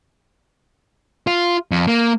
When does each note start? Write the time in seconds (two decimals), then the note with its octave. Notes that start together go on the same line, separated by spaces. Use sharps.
1.27 F4
1.71 F2
1.87 A#3